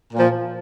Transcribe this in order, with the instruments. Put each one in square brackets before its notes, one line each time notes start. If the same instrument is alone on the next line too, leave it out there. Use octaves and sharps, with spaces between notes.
[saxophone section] A#2 F3